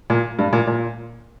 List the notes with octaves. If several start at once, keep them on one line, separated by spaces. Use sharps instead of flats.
A#2
G2
A#2
A#2